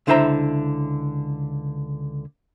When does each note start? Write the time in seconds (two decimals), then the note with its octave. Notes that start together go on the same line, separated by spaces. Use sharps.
0.07 C#2 D3 E4 C5 E5 A#5